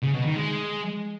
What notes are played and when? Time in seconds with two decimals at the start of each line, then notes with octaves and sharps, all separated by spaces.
0.02 C#3
0.14 B2
0.25 D#3
0.36 G#3